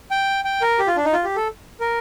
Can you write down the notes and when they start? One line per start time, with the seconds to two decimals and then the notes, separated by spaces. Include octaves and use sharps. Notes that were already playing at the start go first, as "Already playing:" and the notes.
0.11 G5
0.45 G5
0.62 A#4
0.79 G4
0.87 F4
0.96 D4
1.05 D#4
1.13 F4
1.24 G4
1.36 A4
1.80 A#4